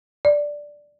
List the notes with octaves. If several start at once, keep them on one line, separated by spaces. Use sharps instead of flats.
D5